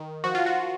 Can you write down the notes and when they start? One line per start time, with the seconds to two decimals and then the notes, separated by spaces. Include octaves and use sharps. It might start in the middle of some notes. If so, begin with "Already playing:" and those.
Already playing: D#3
0.24 F3 F#4
0.35 F4
0.46 F#4